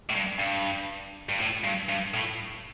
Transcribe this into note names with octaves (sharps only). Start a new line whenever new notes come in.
A2
G2
G2
G2
A2
G2
G2
A2